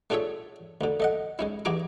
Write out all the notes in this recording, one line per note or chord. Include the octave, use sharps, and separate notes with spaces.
A3 D4 F4 G#4 C#5 E5
D2 D3
A3 D#5 F#5
G#3 C#4 E4
G2 E3 F#4 G#4 A#5 D6